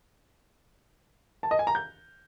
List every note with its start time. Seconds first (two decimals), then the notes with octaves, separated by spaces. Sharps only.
1.43 A5
1.51 D#5
1.59 G#5
1.67 A#5
1.75 G6